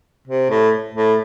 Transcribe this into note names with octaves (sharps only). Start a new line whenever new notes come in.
C3
A2
A2